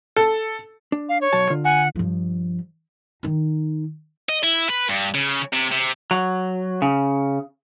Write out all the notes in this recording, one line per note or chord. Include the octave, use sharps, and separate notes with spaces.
A4
D4
F5
C#5
B1 F#3 A5
D3 F4
F#5 G#5
G2 F3
D#3 D#4
D#5
E4
B4
G2
C#3
C3
C3
F#3
C#3